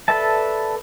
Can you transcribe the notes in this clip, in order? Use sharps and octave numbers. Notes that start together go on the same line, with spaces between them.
A4 B4 D5 E5 A5